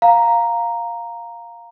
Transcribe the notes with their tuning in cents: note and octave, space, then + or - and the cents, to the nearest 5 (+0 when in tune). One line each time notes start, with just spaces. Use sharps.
F5 +5 A#5 +0